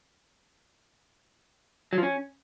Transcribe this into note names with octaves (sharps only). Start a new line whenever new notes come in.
F#3
F3
C#4